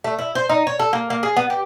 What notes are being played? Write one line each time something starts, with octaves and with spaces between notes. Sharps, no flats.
A3
E4
C5
D#4
C#5
A4
A#3
A#3
G#4
B3
G4